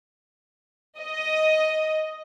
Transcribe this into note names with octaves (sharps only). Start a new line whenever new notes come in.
D#5